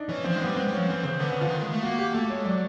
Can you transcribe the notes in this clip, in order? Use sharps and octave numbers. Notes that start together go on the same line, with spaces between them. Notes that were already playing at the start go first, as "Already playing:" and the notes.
Already playing: D4 D#4
E3 C#4
F3 C4
G#3
G3 B3
G#3 C4
G3
F3 C#4
E3 C4
C#3 C4
D3 B3
C#3 B3
D3 F4
E3
D#3
G#3
A3
A#3 F#4
G4
A3 A4
G#3 C#5
F#3 D5